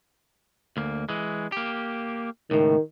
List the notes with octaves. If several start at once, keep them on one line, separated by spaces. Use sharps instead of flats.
D2 A#3
E3 G#3
A#3 G4
C#2 A2 D#3